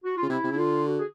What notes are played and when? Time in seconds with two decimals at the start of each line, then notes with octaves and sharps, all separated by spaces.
0.04 F#4
0.17 F4
0.23 C#3
0.29 C3 E4
0.44 C3
0.51 C#3 E4
0.57 D3 F4
0.86 F#4
0.98 G#4